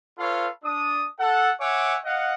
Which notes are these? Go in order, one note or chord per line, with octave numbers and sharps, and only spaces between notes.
F4 A4 B4 C#5 F5
D4 D#6
A4 F#5
C#5 E5 F#5 G#5 D6
D#5 F5 F#5